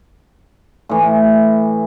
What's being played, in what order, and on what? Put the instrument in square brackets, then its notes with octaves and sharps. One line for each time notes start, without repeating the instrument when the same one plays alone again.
[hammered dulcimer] A2 E3